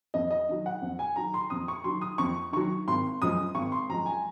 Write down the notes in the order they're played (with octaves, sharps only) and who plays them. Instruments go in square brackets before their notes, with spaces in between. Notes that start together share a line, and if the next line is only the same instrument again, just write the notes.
[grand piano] F2 D#5
D#5
D#3 F#3
F#5
F2
G#5
D#3 F#3 A#5
C6
F2 D#6
C#6
D#3 F#3 C6
D#6
F2 C#6
D#3 F#3 C#6
G#1 C6
F#2 F3 G#3 D#6
G#1 C#6
C6
F#2 F3 G#3 A#5
G#5